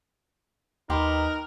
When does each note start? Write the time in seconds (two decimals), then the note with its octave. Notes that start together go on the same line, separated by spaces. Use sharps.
0.90 D#2 D#4 G4 A#4 B4 C6